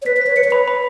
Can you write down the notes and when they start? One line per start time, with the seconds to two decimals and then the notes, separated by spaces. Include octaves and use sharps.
0.02 C#5
0.06 B4 B6
0.17 B4 B6
0.27 C#5
0.37 B4 C#7
0.44 C#5
0.51 B4 B5
0.68 B5